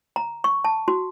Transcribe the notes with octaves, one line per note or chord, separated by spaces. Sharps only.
A#5
C#6
A5
F#4